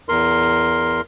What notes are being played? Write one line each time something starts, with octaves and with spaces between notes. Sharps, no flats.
E2 A#4 C6